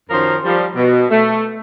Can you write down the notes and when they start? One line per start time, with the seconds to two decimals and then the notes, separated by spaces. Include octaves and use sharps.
0.10 F#2 D#3 F3 C#4 A#4 C5
0.45 F3 G3
0.76 B2
1.10 A3